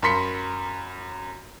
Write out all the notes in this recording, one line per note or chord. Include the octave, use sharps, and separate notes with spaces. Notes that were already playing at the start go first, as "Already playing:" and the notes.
F#2 A#4 B5 C6 B6 C#7